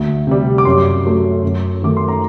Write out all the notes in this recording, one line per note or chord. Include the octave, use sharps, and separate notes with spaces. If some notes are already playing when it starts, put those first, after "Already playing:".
Already playing: D2
C3 G3
D6
F#2 C6
F#3 A3
F#2
D#3 A3 D6
C6
A#5